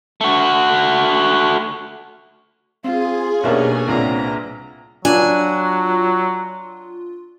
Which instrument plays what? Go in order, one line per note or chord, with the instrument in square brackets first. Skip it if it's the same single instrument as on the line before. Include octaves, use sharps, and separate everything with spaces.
[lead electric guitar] A3 F#4
[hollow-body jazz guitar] C4 [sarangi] F4 [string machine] G#4 G#5
[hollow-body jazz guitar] B1 G4 E5 [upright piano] B2 A#3 D4 [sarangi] C#4
[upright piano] C2 A#2 D4 [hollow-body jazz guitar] B3 C4 [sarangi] A#5
[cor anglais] F#3 [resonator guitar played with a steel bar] D4 [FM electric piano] F4 [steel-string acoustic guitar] G#5